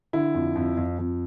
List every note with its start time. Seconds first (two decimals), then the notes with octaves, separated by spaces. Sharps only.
0.13 D3 E4
0.35 F2
0.56 F2
0.77 F2
0.99 F2